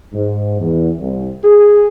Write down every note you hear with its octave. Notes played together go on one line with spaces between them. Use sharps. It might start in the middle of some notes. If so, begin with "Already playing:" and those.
G#2
E2
C2
G#4